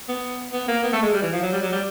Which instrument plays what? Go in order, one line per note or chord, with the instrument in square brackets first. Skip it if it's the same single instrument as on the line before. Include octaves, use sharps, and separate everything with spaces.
[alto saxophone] B3
B3
A#3
B3
A3
G#3
G3
E3
F3
F#3
G3
F#3
G3